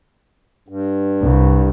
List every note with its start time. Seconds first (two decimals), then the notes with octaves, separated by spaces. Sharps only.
0.68 G2
1.22 C2